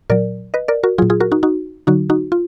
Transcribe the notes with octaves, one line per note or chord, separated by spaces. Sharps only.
A#2 F#3 A#4 D5
B4 D#5
A#4 D5
F#4 A#4
A#2 F#3 F4 G#4
F4 G#4
F#4 A#4
D#4 F#4
D#4 F#4
D3 F#3 D#4 F#4
D#4 F#4
F4